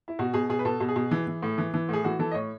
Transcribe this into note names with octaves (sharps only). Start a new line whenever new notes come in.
E4
B2 F#4
B2 G#4
B2 G#4
B4
B2 A4
B2
G#4
B2
E3
E3
A2
E3
E3
A2 G#4
E3 F#4
E3 A4
D#5
A2 C#5